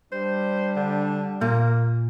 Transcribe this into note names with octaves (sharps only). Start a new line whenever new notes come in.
G3 D4 C5
D3
A#2 A#3